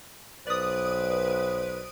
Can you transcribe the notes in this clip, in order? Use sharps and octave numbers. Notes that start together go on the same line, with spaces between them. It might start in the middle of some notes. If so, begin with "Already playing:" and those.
B1 B4 C5 D5 D#6